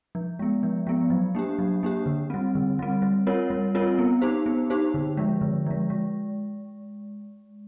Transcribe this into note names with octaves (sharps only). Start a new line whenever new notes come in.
F3
G#3 B3
F3
G#3 B3
F#3
A#3 D4 G4
F#3
A#3 D4 G4
D3
G3 C4
D3
G3 C4
G3
C4 F4 A#4 C#5
G3
C4 F4 A#4 C#5
B3
D#4 G4 C5
B3
D#4 G4 C5
D3
F3 G#3
D3
F3 G#3
G#3